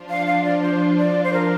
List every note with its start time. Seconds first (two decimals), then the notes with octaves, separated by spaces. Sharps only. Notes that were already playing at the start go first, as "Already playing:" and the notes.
Already playing: F3 D4 F4
0.10 F5
0.27 F5
0.45 D5
0.62 C5
0.98 D5
1.24 C5
1.33 A#4